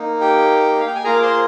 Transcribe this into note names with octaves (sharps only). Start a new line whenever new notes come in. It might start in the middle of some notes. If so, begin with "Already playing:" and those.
Already playing: A#3 D#4
G4 G5
F5
G5
G#5
A#3 F4 G#4 A#4 A#5
D6
C5 C6